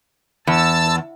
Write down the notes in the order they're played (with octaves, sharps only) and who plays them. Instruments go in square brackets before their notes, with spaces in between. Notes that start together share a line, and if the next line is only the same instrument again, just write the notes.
[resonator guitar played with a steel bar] E2 [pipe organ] A5 E6